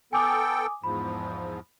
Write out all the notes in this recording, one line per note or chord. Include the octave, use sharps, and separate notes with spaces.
B3 A4 G5 G#5 D6 D#6
E2 G#2 F3 B5